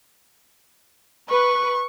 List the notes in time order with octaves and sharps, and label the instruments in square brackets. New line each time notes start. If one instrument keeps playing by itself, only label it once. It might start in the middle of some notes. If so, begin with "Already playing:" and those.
[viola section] B4 [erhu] C#6